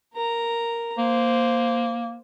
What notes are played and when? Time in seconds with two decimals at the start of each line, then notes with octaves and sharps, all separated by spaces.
0.13 A#4 A#5
0.98 A#3 C5